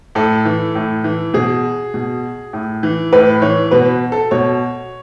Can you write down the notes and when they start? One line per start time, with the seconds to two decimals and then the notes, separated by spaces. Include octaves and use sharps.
0.15 A2 A4
0.45 E3
0.75 A2
1.04 E3
1.34 B2 G#4
1.94 B2
2.53 A2
2.83 E3
3.13 A2 B4
3.42 E3 C#5
3.71 B2 B4
4.12 A4
4.31 B2 C#5